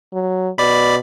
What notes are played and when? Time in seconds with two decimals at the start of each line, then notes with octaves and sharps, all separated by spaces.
0.13 F#3
0.58 B2 D5 B5